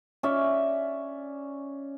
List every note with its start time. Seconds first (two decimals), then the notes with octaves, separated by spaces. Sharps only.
0.23 C#4 D5 E5